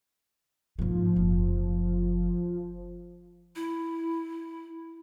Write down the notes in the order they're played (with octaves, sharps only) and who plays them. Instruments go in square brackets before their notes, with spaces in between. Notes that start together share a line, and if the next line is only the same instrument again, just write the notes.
[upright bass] G#2 A#3 [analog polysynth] F3
[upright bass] F#1
[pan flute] E4